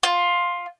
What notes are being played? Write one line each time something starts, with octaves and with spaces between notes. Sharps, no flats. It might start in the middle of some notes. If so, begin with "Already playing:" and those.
F4